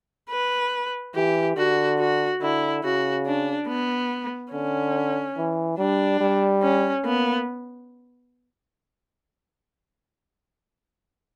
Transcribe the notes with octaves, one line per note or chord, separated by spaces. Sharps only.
B4
E3 G4
D3 F#4
F#4
D3 E4
C#3 F#4
D4
B3
D3 C#4
E3
G3 D4
G3
C#4
A#3 B3